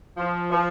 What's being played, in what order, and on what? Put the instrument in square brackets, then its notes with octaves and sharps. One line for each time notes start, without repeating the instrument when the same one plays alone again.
[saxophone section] F3
F3